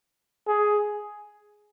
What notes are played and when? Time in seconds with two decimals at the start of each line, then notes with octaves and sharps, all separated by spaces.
0.48 G#4